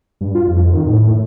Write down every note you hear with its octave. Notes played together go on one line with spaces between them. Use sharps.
G2
F4
F2
D#3
A2